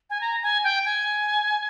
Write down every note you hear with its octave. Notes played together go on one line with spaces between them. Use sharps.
G#5
A#5
G#5
G5
G#5